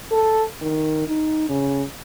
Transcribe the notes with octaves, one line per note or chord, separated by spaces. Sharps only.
A4
D#3
D#4
C#3